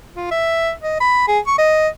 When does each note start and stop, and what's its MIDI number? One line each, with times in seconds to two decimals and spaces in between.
0.15 0.29 65
0.31 0.72 76
0.82 1.00 75
1.00 1.25 83
1.28 1.39 68
1.47 1.58 85
1.58 1.88 75